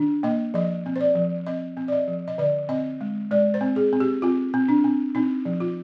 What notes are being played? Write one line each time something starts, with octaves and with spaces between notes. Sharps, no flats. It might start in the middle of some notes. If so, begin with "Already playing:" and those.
Already playing: D#3 D4
A#3 D#5
F3 D#5
C4
C5
D5
F3
C4 D#5
C4
D5
D#5
F3
D#5
D3 D5
C4 D#5
G#3
G#3 D5
C5
C4
G#4
C4
G4
C4 F4
C4
D4
C4
C4 D#4
F3
F4